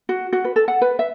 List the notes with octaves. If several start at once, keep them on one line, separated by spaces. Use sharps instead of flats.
F#4
F#4
B4
A4
F#5
B4
E5